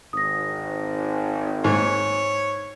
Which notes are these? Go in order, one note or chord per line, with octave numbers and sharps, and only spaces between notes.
G#1 D#6 A#6
G#2 C#5